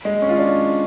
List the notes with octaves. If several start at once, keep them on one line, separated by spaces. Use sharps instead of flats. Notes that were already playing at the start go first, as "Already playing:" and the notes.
G#3
C#4
F4
D4